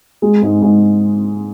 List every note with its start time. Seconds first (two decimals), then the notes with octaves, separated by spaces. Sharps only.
0.22 G#3
0.42 G#2
0.62 G#2